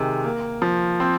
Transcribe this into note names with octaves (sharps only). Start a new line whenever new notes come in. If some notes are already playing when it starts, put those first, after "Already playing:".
Already playing: C3 D#3 G#3
A#3
F3
C4